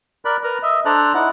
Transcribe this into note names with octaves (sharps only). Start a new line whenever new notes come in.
A#4 D5 B5 F#6
A#4 B4 A#5
D#5 E5
D4 A4 C5 D5 A#5 F#6
D#4 E4 F#5